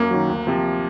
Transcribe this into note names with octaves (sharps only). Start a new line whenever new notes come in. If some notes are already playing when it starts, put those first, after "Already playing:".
Already playing: F#2 A#3
D#3 F#3
D2
C3 F3